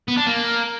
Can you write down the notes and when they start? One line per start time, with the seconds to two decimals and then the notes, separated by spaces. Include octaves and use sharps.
0.08 B3
0.17 D4
0.27 A#3